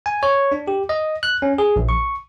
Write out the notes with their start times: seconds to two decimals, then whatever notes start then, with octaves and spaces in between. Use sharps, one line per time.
0.06 G#5
0.23 C#5
0.52 D4
0.67 G4
0.89 D#5
1.23 F#6
1.42 C#4
1.58 G#4
1.76 A#1
1.89 C#6